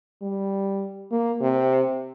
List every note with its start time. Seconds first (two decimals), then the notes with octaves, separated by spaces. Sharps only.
0.22 G3
1.12 A#3
1.41 C3